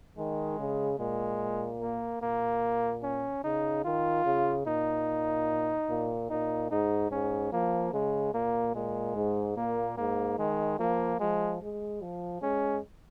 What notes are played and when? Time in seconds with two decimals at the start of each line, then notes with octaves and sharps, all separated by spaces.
0.18 D#3 G#3
0.59 C#3
0.99 A#2 G#3
1.81 A#3
2.22 A#2 A#3
3.03 C#4
3.44 C#3 D#4
3.85 D#3 F4
4.25 C#3
4.66 A#2 D#4
5.90 A#2
6.30 A#2 D#4
6.71 G#2 D#4
7.11 G#2 C#4
7.52 F3 A#3
7.93 C#3 G#3
8.34 A#2 A#3
8.75 A#2 G#3
9.16 G#2
9.57 A#2 A#3
9.97 G#2 A#3
10.38 D#3 G#3
10.79 F3 A#3
11.20 F3 G#3
11.61 G#3
12.01 F3
12.42 G#3 C#4